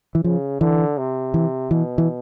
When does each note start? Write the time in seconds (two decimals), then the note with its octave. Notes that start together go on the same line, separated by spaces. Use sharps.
0.15 E3
0.24 C#3 F3
0.61 D3 E3
0.98 C3
1.34 E3
1.71 B2 E3
1.98 E3